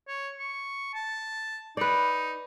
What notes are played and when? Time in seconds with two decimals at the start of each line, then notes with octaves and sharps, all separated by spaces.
0.08 C#5
0.39 C#6
0.94 A5
1.77 D#4 B4 D5